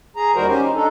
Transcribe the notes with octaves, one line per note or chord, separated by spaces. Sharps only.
G#4 A#5
D#2 D#3 G3 F#4 A#4 C5
C#4 G4 C5
D#4
D4 D#4 A4